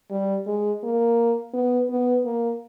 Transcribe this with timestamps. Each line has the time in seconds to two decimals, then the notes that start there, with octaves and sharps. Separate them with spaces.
0.11 G3
0.47 G#3
0.83 A#3
1.54 B3
1.90 B3
2.25 A#3